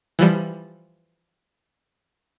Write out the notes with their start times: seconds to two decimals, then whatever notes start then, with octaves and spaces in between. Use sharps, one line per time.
0.19 E3 F3 G3